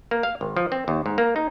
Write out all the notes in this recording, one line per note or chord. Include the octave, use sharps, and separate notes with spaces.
A#3
F5
G#1
F3
C4
D#2
G#2
A#3
D#4